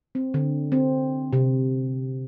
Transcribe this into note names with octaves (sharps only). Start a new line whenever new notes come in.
C4
D3
C4
C3